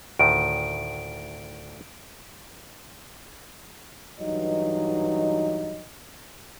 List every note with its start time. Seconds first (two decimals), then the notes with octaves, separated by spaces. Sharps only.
0.19 D2 A2 D#3 D7
4.19 G2 E3 F#3 D#4 D#5